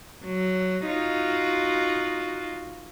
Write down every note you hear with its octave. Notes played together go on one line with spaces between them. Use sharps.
F#3
D#4 F4 F#4